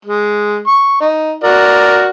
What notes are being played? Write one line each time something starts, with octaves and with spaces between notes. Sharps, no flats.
G#3
C#6
D#4
F#4 A#4 D5